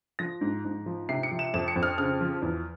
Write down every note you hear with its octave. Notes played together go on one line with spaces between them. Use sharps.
F3 A#6
G#2
G#2
F3
C3 C7
C#7
F3
E7
F2 E7
C#7
F2
F6
C#3 F6
F3
E2